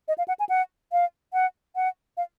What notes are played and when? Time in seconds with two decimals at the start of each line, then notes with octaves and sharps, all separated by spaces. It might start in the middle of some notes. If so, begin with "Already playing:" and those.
0.08 D#5
0.18 F5
0.28 F#5
0.39 G#5
0.49 F#5
0.92 F5
1.33 F#5
1.76 F#5
2.17 F5